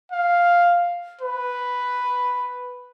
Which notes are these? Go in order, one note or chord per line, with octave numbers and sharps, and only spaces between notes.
F5
B4